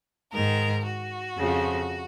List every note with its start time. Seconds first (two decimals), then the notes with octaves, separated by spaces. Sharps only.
0.32 G#2 D#3 A#4
0.85 F#4
1.37 F2 C#3 F3